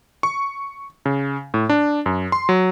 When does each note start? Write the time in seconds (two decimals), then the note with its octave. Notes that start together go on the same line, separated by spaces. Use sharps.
0.23 C#6
1.06 C#3
1.54 A2
1.69 D4
2.06 F#2
2.32 C6
2.49 F#3